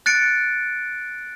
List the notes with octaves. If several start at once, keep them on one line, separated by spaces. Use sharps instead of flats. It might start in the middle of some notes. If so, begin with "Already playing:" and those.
F#6 A6 C#7 D7